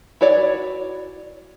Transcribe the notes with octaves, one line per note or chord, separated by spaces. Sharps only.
E4 F#4 C#5 D5